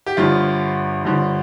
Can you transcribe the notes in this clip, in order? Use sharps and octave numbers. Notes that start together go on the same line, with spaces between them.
G4
G1 G2 D3 F3 F4
G1 G2 D3 F3